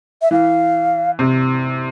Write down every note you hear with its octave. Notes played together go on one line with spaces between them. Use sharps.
E5
E3 F5
C3